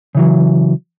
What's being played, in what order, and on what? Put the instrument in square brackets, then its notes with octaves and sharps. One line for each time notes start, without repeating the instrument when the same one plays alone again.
[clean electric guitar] C#3 E3 F#3